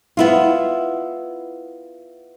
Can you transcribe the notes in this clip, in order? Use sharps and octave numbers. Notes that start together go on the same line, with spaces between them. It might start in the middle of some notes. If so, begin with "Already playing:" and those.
B3 E4 F4